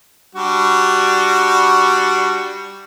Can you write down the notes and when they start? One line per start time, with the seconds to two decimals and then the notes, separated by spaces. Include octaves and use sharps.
0.35 G3 D4 F#4